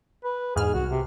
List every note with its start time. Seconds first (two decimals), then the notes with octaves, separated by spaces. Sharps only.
0.24 B4
0.56 E2 G#2 G#4 F6
0.74 C2 F#4
0.91 C3